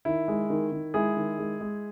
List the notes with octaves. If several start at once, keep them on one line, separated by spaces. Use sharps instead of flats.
D#3 E4
G#3
D#3
D#3
G#3 E4 G#4
D#3
G#3
G#3